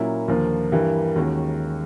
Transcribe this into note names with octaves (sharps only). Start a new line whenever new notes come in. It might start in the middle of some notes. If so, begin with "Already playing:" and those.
Already playing: A#2 F#3 A#3 C#4 E4
D#2 D3 F3 A#3
G2 E3 G3 A#3
D#2 D#3 G#3 C#4 F#4